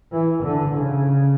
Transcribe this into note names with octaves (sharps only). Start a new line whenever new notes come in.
E3
D3
C#3